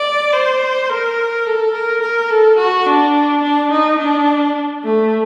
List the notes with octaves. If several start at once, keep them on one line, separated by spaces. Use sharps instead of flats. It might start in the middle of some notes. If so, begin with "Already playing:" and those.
Already playing: D5
C5
A#4
A4
A#4
A#4
A4
F#4
D4
D4
D#4
D4
A3